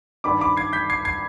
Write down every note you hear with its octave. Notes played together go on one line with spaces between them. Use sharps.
G2 D#3 G3 B5 D6
B5 D6
G#6 C7
G6 B6
G#6 C7
G#6 C7